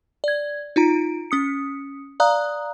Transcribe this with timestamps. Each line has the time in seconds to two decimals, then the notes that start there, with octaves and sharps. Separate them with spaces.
0.24 D5 G#6
0.76 D#4 F4 A#5 D7
1.31 C#4 D#6 C#7
2.20 D5 F5 A#5 D#6 F#6